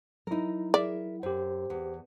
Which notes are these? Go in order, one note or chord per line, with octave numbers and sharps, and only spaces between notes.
F#3 D#4 E4 A#4
G#4 A#4 D5 E5
F#2 G4 C5
E2